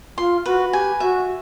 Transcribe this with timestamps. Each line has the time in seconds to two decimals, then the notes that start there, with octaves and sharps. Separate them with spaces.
0.18 F4 C6
0.46 F#4 B4
0.73 G4 G#5
1.00 F#4 E5